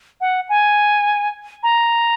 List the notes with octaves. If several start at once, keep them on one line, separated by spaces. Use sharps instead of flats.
F#5
G#5
A#5